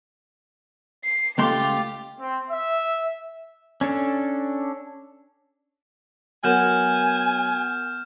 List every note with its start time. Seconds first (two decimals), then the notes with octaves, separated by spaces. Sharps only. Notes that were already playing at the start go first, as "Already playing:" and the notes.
1.04 C7
1.38 C#2 A3 F4 G4 C6
2.20 C4
2.50 E5
3.81 C#4 D4 A4
6.44 F#3 B3 A#4 G#5 F6 G6 E7